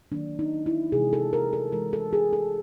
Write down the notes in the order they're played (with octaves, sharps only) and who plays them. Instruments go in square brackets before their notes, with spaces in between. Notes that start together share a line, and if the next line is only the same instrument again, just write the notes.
[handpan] D#3 F#3 A#3 D4
D#4
E4
C3 E3 G#3 G#4
A4
A#4
A4
C3 E3 G#3 A#4
A4
G#4
A4